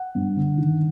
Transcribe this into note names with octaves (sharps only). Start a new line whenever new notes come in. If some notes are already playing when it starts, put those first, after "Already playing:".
Already playing: F#5
G2
D3
D#3